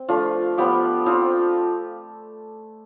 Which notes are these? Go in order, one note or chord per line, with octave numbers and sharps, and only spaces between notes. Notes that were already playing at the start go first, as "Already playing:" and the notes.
Already playing: C4
F3 A3 D4 F4
F3 B3 F4 G4
F3 C4 F4